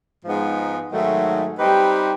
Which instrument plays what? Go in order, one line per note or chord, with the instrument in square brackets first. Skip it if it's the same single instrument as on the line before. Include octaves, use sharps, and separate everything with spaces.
[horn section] G#2 F3 G#3 B3 D#4
G#2 D#3 F#3 A3
G3 C4 D#4 G4 B4